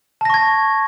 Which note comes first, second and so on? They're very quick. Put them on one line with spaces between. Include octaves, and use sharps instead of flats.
A5 A#6 C#6 G#6